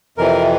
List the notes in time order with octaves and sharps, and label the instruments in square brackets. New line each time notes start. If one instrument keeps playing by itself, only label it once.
[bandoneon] F2 C3 E3 A#4